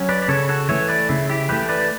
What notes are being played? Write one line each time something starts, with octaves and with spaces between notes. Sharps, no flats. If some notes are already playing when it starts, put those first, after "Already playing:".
Already playing: F#3 C#4
B4 D5
D5
C#3 A4 C#5
F#4 A4
E3 A3 C#5 E5
B4 D5
C#3 E4
E4 G4
E3 A3 G4 B4
B4 D5